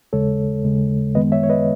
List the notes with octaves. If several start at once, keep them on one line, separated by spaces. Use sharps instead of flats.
D#2 C#3 G#3 A4 C#5
D#2 C#3 G#3
F#2 D#3 G#3 B3 B4 D#5
C#5 E5
C#5
B4 D#5